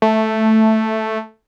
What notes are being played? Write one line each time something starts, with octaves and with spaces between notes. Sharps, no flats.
A3